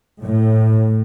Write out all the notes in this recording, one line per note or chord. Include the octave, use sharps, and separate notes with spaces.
A2